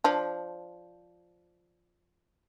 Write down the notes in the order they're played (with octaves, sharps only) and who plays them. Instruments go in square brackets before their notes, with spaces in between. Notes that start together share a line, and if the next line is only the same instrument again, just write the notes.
[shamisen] F3 D4